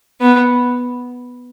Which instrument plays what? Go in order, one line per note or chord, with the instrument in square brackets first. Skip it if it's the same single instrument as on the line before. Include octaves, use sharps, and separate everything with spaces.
[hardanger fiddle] B3